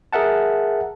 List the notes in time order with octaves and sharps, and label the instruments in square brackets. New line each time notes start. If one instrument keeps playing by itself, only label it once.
[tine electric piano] G#4 A#4 E5 F#5 A5